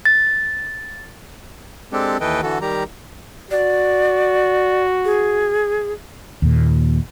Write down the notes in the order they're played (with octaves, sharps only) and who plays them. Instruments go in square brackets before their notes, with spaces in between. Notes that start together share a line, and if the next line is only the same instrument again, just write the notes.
[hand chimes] A6
[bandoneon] G#3 C4 D4 G4 A4
D#2 E3 A4 B4 D#5 G5
D3 E3 F#4 A4
D#3 G3 G4 A#5
[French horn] F#4 [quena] D5
[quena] G#4
[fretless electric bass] D#2 A#2